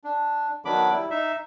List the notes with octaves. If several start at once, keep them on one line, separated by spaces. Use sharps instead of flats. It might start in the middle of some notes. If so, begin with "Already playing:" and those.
D4
D#3 F#3 B3 D4 B5 D6
G3 E4
D#4 E5